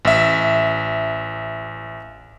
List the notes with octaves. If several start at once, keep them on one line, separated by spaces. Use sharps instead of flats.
A1 E5